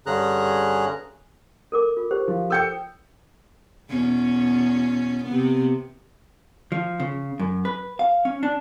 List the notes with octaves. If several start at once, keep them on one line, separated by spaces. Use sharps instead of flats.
G2 D3 C#4 G#4 A#5 F#6
A4 A#4 D6
F4
G4 C5
F3
A4 G5 E6 G6 C#7
E2 B2 C#4
C3 B3
F3
C#3
F#2
B4
F5
C#4
D4